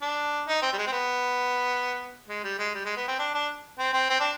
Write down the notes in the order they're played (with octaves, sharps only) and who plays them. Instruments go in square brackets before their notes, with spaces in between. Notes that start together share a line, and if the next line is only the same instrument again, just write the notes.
[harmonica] D4
D#4
C4
G3
G#3
C4
B3
G#3
G3
G#3
G3
G#3
B3
C4
D4
D4
C4
C4
C4
D4